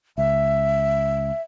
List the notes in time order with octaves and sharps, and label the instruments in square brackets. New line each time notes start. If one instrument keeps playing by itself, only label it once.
[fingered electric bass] C#2 [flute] E5